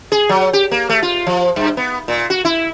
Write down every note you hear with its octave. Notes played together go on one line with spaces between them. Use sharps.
G#4
F#3
G4
A#3
A3
F4
F3
G2
B3
A#2
F#4
E4